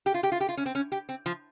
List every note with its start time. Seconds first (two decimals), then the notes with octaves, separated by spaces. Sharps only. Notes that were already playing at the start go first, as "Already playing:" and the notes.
0.06 G4
0.14 F4
0.23 G4
0.32 F4
0.40 G4
0.49 F4
0.57 C#4
0.66 C4
0.75 C#4
0.92 G4
1.09 C4
1.26 F3